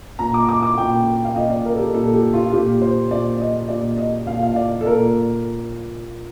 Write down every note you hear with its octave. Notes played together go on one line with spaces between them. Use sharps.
A#2 A#5
D6
D6
D6
A#2 G5
F5
A#2 D#5
D5
A#4
A4
G4
A#2 A4
G4
F4
A#2 G4
C5
A#2 D5
D#5
A#2 D5
D#5
A#2 F5
F5
D5
A4
A#2 A#4